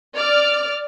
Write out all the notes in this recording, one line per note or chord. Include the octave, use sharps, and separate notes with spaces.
D5 F6